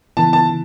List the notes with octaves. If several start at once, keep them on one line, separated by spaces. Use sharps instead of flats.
C#3 E3 B3 E4 A5
A5
C#3